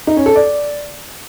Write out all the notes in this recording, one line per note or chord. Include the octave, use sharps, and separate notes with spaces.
D#4
C#4
A4
D5